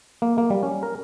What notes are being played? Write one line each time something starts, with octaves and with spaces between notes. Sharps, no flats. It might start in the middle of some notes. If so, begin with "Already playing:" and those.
A#3
A#3
G3
C#4
A#4